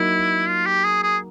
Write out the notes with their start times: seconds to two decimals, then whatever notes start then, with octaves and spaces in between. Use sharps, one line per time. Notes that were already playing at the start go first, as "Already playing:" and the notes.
Already playing: F#3 A#3 D#4 E4 F#4
0.48 F4
0.66 G4
0.85 G#4
1.03 G#4